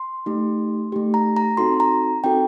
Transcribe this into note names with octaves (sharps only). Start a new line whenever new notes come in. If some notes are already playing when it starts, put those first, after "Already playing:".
Already playing: C6
A3 D#4 G4
A3 D#4 G4
A#5
A#5
C4 D#4 F#4 A4 C6
A#5
C4 D#4 F#4 A4 G5